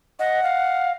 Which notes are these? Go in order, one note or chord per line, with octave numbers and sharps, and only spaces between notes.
D#5 F#5
F5